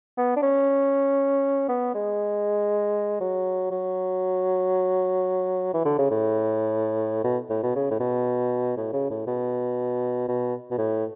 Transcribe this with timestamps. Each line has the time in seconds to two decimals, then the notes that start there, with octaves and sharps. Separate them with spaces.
0.18 B3
0.36 D4
0.43 C#4
1.69 B3
1.95 G#3
3.20 F#3
3.71 F#3
5.74 E3
5.85 D3
5.98 C#3
6.11 A2
7.24 B2
7.50 A2
7.63 B2
7.75 C#3
7.91 A2
8.00 B2
8.77 A2
8.93 C#3
9.11 A2
9.27 B2
10.28 B2
10.71 B2
10.78 A2